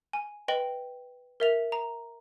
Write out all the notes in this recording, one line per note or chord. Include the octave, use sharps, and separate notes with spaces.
G#5
B4 D#5 G5 F#7 G7
A#4 E5 F7
A#5